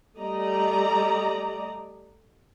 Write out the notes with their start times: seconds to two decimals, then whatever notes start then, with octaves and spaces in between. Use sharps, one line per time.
0.19 G3 A3 D5 D#5 A#5